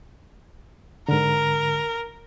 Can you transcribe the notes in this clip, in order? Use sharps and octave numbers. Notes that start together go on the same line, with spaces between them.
G#2 D3 A#4